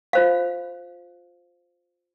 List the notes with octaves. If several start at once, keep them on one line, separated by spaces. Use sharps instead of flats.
F4 C5 F5